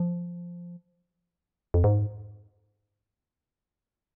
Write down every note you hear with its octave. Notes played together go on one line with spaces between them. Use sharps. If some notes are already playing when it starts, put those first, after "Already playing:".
Already playing: F3
F2
G#2